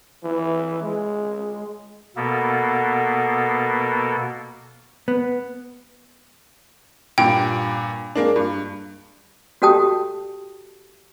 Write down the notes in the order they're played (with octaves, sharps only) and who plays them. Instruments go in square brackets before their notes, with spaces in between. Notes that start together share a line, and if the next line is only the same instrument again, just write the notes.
[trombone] E3
G#3
[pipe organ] B2 A#3 B3 A4
[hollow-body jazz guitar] B3
[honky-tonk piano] G2 A#2 [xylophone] G5
[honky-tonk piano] G#3 A#3 D4
G2
[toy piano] F#4 G4 A4 G5 A5 D#6